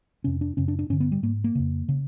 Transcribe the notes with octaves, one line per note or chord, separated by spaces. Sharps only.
F2 C3 C#4
D4
F#2 C#3 C#4
D4
D4
G2 D3 C#4
B3
G3
G#2 A#3
A#3
F2 C#3
C#3